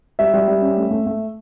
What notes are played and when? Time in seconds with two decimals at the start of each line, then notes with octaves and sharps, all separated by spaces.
0.19 G3 E5
0.34 G3
0.48 G3
0.62 C#4
0.77 A3
0.91 A3
1.06 A3